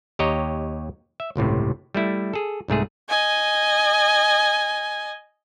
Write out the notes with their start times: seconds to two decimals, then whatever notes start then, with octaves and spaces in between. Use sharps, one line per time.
0.19 D#2 G4 C#5 D#5 A#5
1.20 E5
1.36 G1 C#2 A2 C3
1.95 G3 A3 E4
2.34 G#4 A4
2.68 C2 G#2 A3 G#4
3.09 D#5 G#5